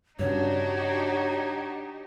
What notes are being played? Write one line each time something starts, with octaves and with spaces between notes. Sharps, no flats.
G2 C#3 D4 D#4 F#4 G4 C#5